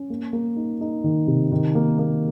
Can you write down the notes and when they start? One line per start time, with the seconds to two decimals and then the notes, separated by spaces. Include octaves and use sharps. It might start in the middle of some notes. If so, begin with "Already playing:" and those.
Already playing: C#4
0.10 A#3
0.33 A#3
0.56 D#4
0.81 D#4
1.04 D#3
1.27 C3
1.52 D#3
1.75 A#3
1.99 A#3